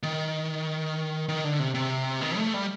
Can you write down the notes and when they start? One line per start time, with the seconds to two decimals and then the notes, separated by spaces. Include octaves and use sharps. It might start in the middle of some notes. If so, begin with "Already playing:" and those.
0.03 D#3
1.29 D#3
1.44 D3
1.59 C3
1.74 C3
2.21 D#3
2.37 A3
2.54 G3